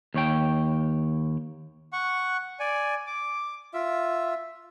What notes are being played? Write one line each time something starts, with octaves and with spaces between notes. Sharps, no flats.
D#2 C#5 G5
F#5 C#6
D5 G#5
D6
F4 E5